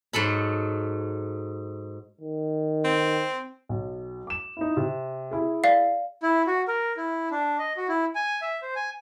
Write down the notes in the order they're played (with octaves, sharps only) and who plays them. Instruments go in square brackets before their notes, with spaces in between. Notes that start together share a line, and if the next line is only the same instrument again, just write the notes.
[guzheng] G#2 F#3 A4 B5
[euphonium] D#3
[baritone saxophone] C4
[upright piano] B1
D6 E7
D#4 E4
C3
E4 G#4
[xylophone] D5 F5
[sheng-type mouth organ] E4
F#4
A#4
E4
D4
D#5
F#4
E4
G#5
E5
C5
G#5